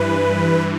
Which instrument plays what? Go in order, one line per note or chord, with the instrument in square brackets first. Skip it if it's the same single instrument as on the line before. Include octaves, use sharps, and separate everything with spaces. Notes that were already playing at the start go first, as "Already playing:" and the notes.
Already playing: [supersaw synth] G2 E3 B4